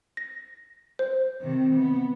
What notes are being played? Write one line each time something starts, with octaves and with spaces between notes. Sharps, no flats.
A#6
C5
C3 D#3
B3